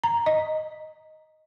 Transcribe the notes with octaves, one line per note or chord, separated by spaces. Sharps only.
A#5
D#5